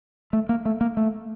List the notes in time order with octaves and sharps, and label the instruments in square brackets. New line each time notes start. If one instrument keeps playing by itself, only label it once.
[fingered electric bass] A3
A#3
A3
A#3
A3